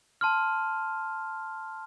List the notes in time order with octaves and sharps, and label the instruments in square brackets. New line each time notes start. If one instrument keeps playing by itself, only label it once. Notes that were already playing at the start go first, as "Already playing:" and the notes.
[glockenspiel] A5 C6 F6